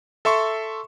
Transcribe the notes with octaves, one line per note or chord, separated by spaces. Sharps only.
A4 E5 C6 C#6